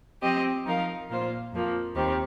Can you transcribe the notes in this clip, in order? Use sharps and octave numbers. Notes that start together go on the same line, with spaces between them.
F3 C4 G4 D#5
F3 D#4 A#4 F5
A#2 A#3 F4 C5
F2 F3 A#3
D#2 D#3 C4 G4